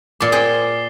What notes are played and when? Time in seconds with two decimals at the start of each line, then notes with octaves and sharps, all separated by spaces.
0.20 A#2 C6 D6 A6 C7
0.32 G#4 C5 G5 C7 G7